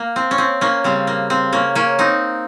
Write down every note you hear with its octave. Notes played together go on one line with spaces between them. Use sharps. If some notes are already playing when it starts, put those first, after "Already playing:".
Already playing: A#3
C4
C#4
C4
A#3 C#4
C#3 G3 C4
A#3
C4
A#3 C#4
A#3 C#4
C4 D#4